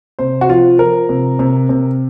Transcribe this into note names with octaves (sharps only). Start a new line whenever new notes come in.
C3 C5
F#4
F3 F4
F3 A#4
C3
C3
C3